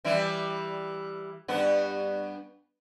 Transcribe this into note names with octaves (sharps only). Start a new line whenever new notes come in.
E3 G3 E4
G2 B3